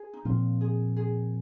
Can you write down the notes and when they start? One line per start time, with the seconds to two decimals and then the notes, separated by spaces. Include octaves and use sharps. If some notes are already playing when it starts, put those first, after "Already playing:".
Already playing: G#4
0.13 D#4
0.25 A#2 F3 C4 F4
0.61 G#4
0.97 G#4